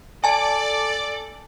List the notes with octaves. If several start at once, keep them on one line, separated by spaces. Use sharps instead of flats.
A4 D5 G#5 A5